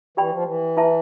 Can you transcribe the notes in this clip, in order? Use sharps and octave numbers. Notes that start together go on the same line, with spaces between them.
E3 G4 D5 G5 B5
F3
E3
E4 B4 E5 A5 C6